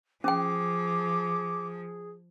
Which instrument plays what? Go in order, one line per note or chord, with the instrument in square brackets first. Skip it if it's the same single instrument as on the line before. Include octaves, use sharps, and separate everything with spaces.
[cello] F3 [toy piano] C#4 G5 [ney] G#4 [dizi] D6